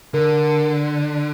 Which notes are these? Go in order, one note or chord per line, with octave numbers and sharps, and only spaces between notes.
D3 A#4